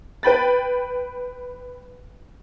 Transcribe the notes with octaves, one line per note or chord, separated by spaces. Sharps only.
B4 G5 B5 A6